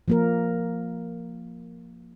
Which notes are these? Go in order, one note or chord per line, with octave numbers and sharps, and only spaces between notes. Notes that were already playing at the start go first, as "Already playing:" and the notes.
F3 A#3 A#4